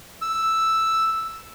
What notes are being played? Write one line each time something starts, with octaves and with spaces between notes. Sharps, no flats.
E6